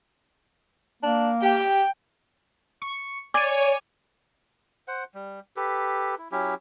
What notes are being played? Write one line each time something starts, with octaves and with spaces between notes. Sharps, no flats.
A#3 D4
G4 G5
C#6
C#5 D5 G#5 D6 D#7
C5 F#5
G3
G4 A4 B4
E4
F#3 C#4 E4 G4